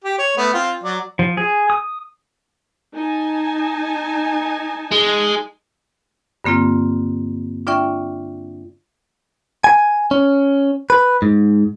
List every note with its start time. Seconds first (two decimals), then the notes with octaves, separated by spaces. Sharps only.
0.04 G4
0.18 C#5
0.37 A3 B3
0.54 C4 F4
0.83 F#3 D5
1.19 F3
1.37 G#4
1.70 D#6
2.95 D#4 G#5 A5
4.92 G#3
6.44 G2 D3 A#3 C4 F4
7.67 D4 F4 D5 E5 G5 C#6
9.64 G#5
10.11 C#4
10.90 B4
11.22 G#2